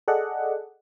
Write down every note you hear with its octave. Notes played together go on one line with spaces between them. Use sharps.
G#4 A4 D5 D#5 F#5